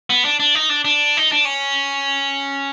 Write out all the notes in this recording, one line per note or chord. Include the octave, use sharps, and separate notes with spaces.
B3
D4
D4
D#4
D4
D4
D#4
D4
C#4